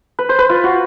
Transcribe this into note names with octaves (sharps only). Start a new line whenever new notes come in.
B4
C5
B4
F4
F#4